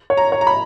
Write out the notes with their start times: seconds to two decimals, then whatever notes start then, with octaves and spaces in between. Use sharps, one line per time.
0.10 C#5
0.17 A#5
0.32 C#5
0.41 A#5
0.47 B5